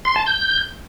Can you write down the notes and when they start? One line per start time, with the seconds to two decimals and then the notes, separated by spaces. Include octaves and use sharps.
0.05 C6
0.16 A5
0.26 G6